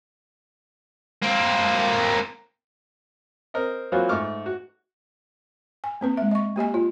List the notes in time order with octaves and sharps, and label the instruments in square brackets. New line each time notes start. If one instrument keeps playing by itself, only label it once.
[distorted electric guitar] A#3 C4
[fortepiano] C4 A#4 D#5
E3 F#3 A#3 C4 F4 F#4
G#2 A3 C#6 D6 F6
F#4
[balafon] G#5
A#3 C4 B4
G#3 E5
D#5 C#6
A#3 G4 D#5 G#5
F4